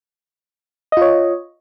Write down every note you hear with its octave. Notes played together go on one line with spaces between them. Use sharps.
F4 C#5 D#5